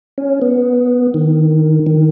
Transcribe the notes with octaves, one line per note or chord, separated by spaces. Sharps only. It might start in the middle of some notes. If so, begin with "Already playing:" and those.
C#4
B3
D#3
D#3